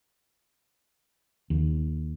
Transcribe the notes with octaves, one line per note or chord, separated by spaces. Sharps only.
D#2